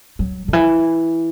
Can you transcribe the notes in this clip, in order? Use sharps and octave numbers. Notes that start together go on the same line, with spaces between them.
F#3
D3
E3